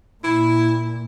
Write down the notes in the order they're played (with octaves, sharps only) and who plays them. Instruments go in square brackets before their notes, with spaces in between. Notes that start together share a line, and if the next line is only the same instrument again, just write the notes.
[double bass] A#2 [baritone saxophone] E4